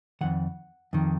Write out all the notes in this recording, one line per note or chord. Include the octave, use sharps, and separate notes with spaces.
F2 D#3 F#5
F2 D#3